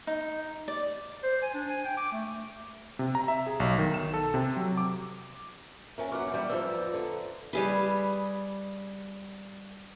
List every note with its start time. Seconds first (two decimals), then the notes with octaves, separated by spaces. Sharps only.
0.07 D#4
0.68 D5
1.23 C5
1.43 G#5
1.55 D4
1.70 G#5
1.85 G5
1.97 D6
2.12 A3
2.99 C3
3.15 A#5
3.28 E5
3.47 G#4
3.60 B1
3.78 D#3
3.94 E7
4.14 A4
4.34 C3
4.56 F#3
4.77 D6
5.98 B3 C#4 A#4 E5 G#5
6.12 F#3 F#5 C#6 D6 F6
6.31 E3 G3 E5
6.50 F2 F3 B4 D5 E6
6.69 A#5
6.93 D3 A4
7.53 G3 G#4 B4